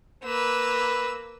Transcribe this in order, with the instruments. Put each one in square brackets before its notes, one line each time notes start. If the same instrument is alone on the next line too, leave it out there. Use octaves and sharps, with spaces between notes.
[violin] A#3 E6 [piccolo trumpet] B4